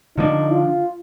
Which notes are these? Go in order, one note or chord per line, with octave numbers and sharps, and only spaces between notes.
D3 F3 A#3 D4 D#4
F4